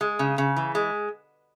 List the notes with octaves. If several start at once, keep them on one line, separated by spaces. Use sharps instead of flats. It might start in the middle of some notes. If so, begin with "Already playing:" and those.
G#3
C#3
C#3
E3
G#3